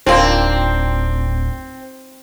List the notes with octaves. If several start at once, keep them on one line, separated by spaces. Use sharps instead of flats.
D1 A#3 C4 D4 D#4 F4 C6